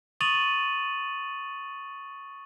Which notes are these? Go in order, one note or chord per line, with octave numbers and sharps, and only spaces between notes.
C#6 D#6 A6 D#7 F7 F#7